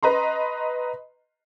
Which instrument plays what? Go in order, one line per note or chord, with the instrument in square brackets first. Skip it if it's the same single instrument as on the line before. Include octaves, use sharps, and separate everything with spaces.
[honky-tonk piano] B4 D#5 A#5 C6